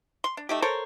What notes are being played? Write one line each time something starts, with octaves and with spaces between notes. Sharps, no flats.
C6
D4
A3 D#4 G4
A4 A#4 C5 C#5